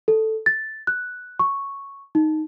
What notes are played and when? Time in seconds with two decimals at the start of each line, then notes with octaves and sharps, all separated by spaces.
0.08 A4
0.46 A6
0.87 F#6
1.39 C#6
2.15 D#4